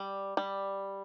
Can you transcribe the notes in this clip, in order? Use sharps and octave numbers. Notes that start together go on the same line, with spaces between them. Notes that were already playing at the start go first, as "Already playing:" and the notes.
Already playing: G3
G3